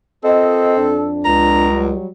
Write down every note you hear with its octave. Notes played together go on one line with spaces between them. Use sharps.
C4 F4 A4 A#4 D#5
F2 D4
C#2 A#5
F#3 G3